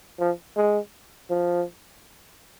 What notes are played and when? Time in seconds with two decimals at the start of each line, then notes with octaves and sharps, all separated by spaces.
0.20 F3
0.57 G#3
1.30 F3